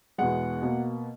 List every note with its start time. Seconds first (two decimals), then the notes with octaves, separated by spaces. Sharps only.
0.18 E2 B2 G#3 F#5
0.62 B2 A#3